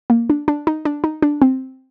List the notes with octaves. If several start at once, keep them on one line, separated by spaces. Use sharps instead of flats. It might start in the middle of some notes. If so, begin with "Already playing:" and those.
A#3
D4
D4
D#4
D4
D#4
D4
C4